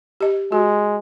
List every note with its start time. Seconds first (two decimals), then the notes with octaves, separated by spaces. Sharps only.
0.21 G4 D#5
0.52 G#3 F#4